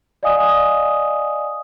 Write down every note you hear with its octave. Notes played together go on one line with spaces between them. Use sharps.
D5 D#5 F5 G#5 D#6